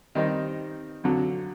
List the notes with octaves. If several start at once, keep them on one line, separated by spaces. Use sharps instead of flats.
D#3 G3 C4 D#4
F2 D3 F#3